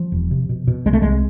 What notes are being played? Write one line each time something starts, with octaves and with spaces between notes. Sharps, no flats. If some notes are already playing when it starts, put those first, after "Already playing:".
Already playing: F3
E1
C3
B2
B2
C2 G#3
A3
C2 G#3